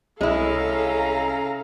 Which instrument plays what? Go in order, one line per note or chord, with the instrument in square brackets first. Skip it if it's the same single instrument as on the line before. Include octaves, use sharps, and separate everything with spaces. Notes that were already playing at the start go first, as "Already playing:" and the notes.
[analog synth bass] C2 [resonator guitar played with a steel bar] G#3 E4 [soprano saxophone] C#4 [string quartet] A4 F5 A#5